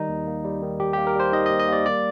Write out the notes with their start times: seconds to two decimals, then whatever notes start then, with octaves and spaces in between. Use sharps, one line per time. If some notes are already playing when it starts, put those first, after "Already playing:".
Already playing: D#3 G3 D#4
0.09 D#2
0.27 A#3
0.45 G3
0.62 D#3
0.80 D#2 G4
0.93 A#3 G4
1.07 A#4
1.15 G3 C5
1.33 D#3 D#5
1.46 D#5
1.51 D#2
1.59 D#5
1.68 A#3 D5
1.86 G3 D5